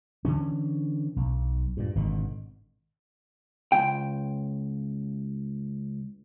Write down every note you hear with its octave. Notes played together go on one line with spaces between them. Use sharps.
D3 E3 C#4
B1
G2 A#2
G#1 B2 D3
C#2 G5